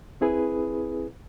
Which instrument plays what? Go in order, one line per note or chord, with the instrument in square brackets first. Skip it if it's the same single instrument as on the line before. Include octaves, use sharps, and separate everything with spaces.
[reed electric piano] C4 E4 G#4 B4